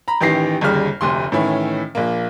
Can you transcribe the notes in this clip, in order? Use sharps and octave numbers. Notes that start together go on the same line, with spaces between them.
A#5 B5
A1 D#3 E3 G4 A#6 C7
G1 D#2 C#3 G3 F6
F1 D2 C3 C6
A2 D#3 E3 C#4 E4
A#1 A#3